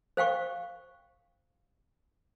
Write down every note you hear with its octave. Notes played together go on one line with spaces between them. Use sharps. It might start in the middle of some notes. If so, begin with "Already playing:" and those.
C5 F5 G5 C#6